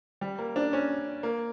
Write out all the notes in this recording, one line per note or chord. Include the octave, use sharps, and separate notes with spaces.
G3
A#3
D4
C#4
A#3